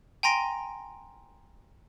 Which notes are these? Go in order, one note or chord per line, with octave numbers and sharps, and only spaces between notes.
G5 G#5 A#5 C6 A#6 D7